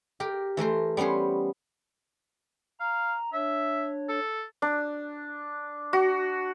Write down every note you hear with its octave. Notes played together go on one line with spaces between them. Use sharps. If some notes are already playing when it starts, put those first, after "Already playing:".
G4 A#4
E3 A3 A#4 C5
G3 B3 C#4 C5 C#5
F5 A#5
D4 C#5 E5
A4
D4
F#4